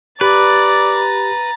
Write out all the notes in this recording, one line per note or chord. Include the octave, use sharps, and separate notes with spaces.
G4 B4 D5 A#5 B5 A6